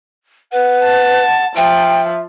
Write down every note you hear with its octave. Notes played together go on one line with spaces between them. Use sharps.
B4 F#5
A5
F3 E5 G5